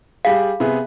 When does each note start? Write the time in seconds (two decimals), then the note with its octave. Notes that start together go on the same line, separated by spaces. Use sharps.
0.25 G3 G#4 F5
0.60 C3 B3 G#4